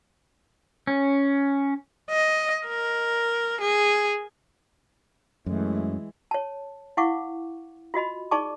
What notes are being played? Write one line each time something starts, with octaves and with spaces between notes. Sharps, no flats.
C#4
D#5
A#4
G#4
F#2 E3 G#3 A3
C#5 A5
E4 F5 F#5 C#6 D6
F4 F#4 D#5 B5
D#4 G#4 D5 A5 C#6 D6